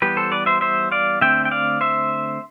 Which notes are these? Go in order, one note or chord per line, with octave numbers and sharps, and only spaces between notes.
E3 G3 B3 G4 B4
A4 C5
B4 D5
C5 E5
C5 E5
D5 F5
D3 A3 C4 E5 G5
G5
D5 F5
C5 E5